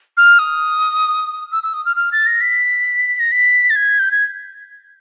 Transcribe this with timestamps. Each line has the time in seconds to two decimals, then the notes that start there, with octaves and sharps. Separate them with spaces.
0.17 F6
0.39 D#6
1.52 E6
1.63 E6
1.73 D#6
1.85 F6
1.96 F6
2.12 A6
2.26 A#6
2.41 B6
3.19 A#6
3.32 B6
3.70 A6
3.76 G#6
3.99 G6
4.11 G#6